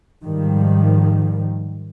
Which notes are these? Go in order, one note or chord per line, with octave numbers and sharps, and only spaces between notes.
G#2 D#3 F3 G3